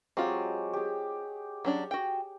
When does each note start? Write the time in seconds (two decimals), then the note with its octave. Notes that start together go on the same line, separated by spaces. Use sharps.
0.17 F#3 G#3 C4 F4 G4
0.73 G4 G#4
1.65 F#3 C#4 D4
1.91 F#4 G5